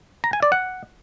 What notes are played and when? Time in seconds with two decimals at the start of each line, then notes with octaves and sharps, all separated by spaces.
0.24 A#5
0.33 G#5
0.42 D5
0.52 F#5